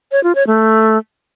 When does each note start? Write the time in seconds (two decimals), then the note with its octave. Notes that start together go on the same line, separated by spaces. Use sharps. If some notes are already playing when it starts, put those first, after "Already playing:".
0.12 C#5
0.24 F4
0.35 C#5
0.47 A3